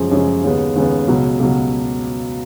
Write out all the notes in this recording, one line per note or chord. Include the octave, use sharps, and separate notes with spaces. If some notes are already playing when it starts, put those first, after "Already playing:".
Already playing: F#2 C#3 F3 G#3
F#2 C#3 F3 G#3
D#2 C#3 G#3 B3
D#2 C#3 G#3 B3
C#2 B2 F#3
C#2 B2 F#3